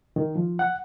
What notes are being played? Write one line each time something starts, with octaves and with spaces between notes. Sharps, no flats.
D#3
F3
F#5